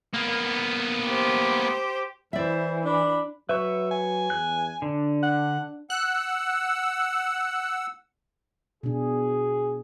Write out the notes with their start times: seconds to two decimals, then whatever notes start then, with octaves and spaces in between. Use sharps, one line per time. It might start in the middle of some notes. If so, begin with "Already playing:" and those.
0.14 A#3 B3
1.07 G4 C5
2.33 E3 E4 C5 D5 E5
2.85 D4 B5
3.49 F#3 B4 E5 C#6
3.91 G#5
4.30 E2 F#6
4.82 D3 D4
5.23 F#5
5.90 F#5 E6 F#6
8.83 B2 D4 G#4